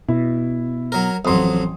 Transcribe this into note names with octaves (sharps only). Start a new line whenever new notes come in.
B2 E4
F#3 A#4
A1 F2 F#3 C6 D#6